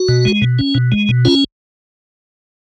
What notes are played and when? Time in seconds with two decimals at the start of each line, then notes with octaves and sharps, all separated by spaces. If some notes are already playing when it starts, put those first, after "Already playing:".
Already playing: F#4
0.09 B2
0.25 G#3
0.42 B2
0.59 C#4
0.75 B2
0.92 G#3
1.09 B2
1.25 C#4 F4